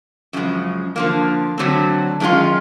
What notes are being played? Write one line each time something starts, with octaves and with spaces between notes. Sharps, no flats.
F#2 C#3 F3 G#3
D3 F3 A#3
D3 F#3 A3 C4
F#2 D#3 G#3 C#4 F4